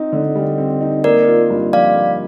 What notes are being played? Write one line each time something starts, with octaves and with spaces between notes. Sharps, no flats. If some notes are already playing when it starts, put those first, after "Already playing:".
Already playing: C4 D#4
D3
G3
C4
D#4
A#3 A#4 D5
F4
G2
F3 D5 F5
A#3